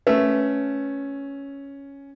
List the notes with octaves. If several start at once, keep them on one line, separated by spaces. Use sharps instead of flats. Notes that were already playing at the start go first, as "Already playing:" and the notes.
A3 C#4 B4